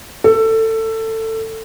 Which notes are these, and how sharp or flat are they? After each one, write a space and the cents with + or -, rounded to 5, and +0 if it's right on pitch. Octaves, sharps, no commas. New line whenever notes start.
A4 +20